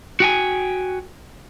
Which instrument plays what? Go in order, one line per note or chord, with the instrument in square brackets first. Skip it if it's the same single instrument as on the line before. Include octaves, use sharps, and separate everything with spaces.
[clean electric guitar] F#4 G5 G#5